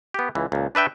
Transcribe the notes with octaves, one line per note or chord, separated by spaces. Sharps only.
B3 G4
C#2 E3
C#2 A#2
D4 B4 E5 G5